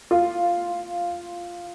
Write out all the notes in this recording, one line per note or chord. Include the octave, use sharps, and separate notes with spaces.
F4